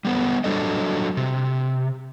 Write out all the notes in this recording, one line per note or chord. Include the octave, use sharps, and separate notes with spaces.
G3 B3 C5
F#3 G3 D4 A4 D#5
C3